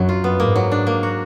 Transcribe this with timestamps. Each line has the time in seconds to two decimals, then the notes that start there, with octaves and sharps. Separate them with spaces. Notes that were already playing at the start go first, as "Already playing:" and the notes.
Already playing: F#2 F#3 D4
0.09 F4
0.24 B3
0.40 G#2 A#3
0.56 F#3
0.71 D4
0.87 A#3
1.03 F#4